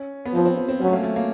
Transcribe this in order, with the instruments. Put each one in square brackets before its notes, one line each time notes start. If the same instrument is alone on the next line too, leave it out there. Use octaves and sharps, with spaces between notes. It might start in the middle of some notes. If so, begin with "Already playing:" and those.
Already playing: [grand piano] C#4
B3
[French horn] F3 [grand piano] C4
[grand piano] C4
C4
C4
[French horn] F#3 [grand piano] C#4
[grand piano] A3
A#3
A3
A#3